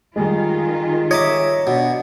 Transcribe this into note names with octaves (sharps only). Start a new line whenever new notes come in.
D#3 G3 G#3 F4
C#5 D#5 E5 A#5 D6
B2 D4